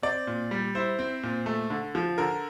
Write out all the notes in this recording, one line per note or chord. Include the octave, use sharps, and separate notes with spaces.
C4 D5
A#2
G3
E4 C5
C4
A#2
A3
D3
F3
D3 A#4